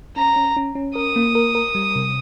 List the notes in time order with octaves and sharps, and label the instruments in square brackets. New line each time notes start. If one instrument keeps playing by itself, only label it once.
[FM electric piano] C#4 [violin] A#5
[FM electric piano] C#4
C#4
C#4
[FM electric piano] A#4 [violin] D#6
[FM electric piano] A#3
A#4
A#4
G3
C3